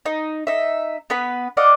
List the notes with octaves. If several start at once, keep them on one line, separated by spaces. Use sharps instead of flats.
D#4
D#4 E5
B3 B4 B5
D5 D#5 F5 F#5